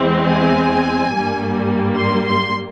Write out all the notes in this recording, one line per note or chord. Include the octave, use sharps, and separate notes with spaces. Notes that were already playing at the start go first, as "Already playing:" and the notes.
Already playing: E2 E3 G#3 C4
G#5
G2 G3 A#3
C6
C6